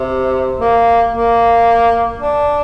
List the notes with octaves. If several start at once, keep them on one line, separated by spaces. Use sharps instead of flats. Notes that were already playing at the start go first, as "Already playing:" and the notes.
Already playing: C3
A#3
A#3
D4